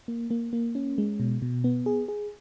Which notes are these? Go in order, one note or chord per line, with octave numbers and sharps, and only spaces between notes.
A#3
A#3
A#3
C#4
G#3
B2
B2
B3
G#4
G#4